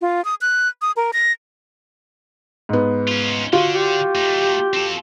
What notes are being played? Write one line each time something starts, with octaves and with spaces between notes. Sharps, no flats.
F4
D#6
F#6
D#6
A#4
A#6
G#2 B3
C#4 F4
D3 F4 F#4
G4
A3 D#4
C4 A4